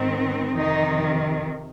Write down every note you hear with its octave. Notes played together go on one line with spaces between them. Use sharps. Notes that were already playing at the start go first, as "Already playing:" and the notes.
Already playing: G#2 D#3 C4
F2 C3 D#3 D#4